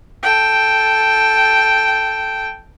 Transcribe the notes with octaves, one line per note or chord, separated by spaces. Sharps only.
A4 G5